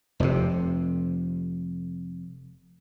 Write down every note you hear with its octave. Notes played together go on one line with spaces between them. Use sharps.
F1 F2 G#2 C3